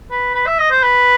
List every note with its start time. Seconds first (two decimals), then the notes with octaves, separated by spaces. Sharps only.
0.11 B4
0.35 B4
0.46 E5
0.59 D#5
0.71 C5
0.83 B4